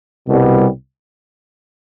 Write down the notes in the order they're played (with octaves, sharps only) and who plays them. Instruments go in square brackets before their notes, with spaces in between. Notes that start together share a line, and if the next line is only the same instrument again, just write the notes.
[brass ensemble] C2 B2 G3